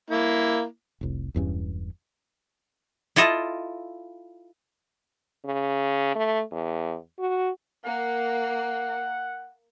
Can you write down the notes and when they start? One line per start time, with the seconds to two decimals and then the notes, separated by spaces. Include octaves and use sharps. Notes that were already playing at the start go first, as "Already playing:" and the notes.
0.10 A#3 E4
1.01 F1 C2
1.34 E1 E2 G2 C#4
3.16 E4 F4 A4 D#5
5.45 C#3
6.15 A3
6.52 E2
7.19 F#4
7.85 A#3 F#5